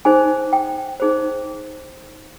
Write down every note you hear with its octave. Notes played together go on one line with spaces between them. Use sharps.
D#4 G#4 C5 G#5
G5
D#4 G#4 C5